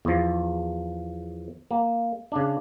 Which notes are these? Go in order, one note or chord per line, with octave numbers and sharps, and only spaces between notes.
E2 F3
A#3
C#3 D4